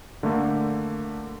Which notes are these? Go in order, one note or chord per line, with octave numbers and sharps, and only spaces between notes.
D3 A3 A#3